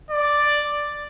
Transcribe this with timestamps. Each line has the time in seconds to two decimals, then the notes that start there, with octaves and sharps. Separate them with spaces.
0.11 D5